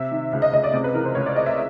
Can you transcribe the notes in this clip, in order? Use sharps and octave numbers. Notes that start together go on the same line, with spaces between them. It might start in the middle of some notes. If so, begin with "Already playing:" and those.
Already playing: C3 E5
D#3
C#2 E5
D#5
C#2 D#5
D5
C3
B4
E3 A#4
C5
C#2 C#5
D5
C#2 D#5
E5